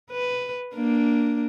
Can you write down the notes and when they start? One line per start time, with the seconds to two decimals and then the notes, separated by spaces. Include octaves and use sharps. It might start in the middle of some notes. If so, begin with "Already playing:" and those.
0.11 B4
0.75 A#3 D4